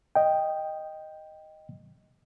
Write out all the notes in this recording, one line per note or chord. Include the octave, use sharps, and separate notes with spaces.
D#5 G5